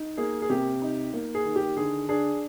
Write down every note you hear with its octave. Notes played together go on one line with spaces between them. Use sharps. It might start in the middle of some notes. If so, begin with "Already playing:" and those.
Already playing: D#4
A#3 G#4
G#4
C3 G4
D#4
A#3
G#4
D#3
G4
D3 G#4
D4 G#4